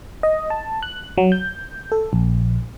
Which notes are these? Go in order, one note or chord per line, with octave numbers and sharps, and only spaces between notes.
D#5
A5
F#6
F#3
G6
A4
A#1